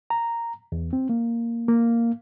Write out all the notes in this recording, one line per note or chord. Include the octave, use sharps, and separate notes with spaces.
A#5
E2
C4
A#3
A#3